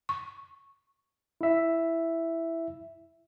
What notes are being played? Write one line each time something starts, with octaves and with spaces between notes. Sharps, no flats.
C#6
E4 E5